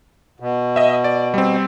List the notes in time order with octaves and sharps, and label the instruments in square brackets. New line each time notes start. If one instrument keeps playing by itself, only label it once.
[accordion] B2
[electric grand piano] D#5 E5
D5
G3 C4